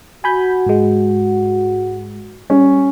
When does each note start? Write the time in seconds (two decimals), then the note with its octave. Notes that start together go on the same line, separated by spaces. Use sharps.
0.24 F#4 G#5 B5 G6
0.66 G#2 G#3
2.50 G3 C#4